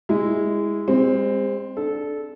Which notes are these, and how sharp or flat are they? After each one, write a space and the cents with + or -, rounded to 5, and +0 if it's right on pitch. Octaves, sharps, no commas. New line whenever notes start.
G#3 -20 E4 -10
G#3 -40 C4 +0
D4 +0 A4 -15